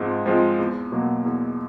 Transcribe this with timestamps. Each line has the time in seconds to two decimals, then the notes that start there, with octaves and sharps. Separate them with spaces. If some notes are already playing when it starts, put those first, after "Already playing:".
Already playing: G#2 F3 G#3 C4 F4
0.26 F3 G#3 C4 F4
0.59 E2
0.92 B2 F#3 A#3
1.25 E2